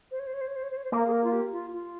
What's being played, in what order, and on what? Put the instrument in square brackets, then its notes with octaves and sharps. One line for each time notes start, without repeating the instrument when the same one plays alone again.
[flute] C5
C#5
C5
C#5
C5
C#5
C5
C#5
C5
C#5
C5
[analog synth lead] A#3 [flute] A#4
[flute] G#4
A#4
F4
G4
F4
F4